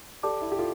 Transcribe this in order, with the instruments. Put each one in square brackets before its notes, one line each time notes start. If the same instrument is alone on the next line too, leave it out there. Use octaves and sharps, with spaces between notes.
[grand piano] G4 [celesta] A4 D5 A5 D6
[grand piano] E4
G4
[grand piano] F4 [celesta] A4